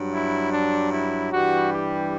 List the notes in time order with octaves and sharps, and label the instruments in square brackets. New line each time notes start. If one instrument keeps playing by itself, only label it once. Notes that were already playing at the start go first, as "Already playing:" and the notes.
Already playing: [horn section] G2 F#3
E4
D4
E4
G2 E3 G3 F#4
G4